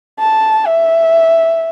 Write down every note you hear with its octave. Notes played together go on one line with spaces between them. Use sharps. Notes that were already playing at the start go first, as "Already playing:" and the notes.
A5
E5